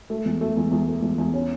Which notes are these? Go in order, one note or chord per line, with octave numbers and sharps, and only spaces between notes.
A3
E2
A3
E2
E2
A3
E2
E2
C#4